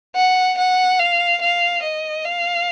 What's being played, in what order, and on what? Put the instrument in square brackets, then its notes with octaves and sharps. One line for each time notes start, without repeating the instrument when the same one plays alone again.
[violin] F#5
F#5
F5
F5
D#5
F5